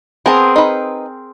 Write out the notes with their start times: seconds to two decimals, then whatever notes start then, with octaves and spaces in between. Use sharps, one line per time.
0.26 B3 C4 G#4 A#4 A5
0.56 D#4 B4